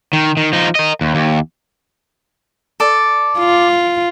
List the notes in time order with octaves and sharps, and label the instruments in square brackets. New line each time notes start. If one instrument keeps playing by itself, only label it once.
[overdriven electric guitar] D#3
D#3
F3 D#4
A#4 D#5
D#2
D#2
[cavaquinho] A4 D5
[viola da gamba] F4